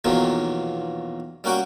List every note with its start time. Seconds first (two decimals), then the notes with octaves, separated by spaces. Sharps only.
0.04 B1 E2 A#2 D#3 F3 F#3
1.44 G3 A#3 C#4 F#4 F#5 G5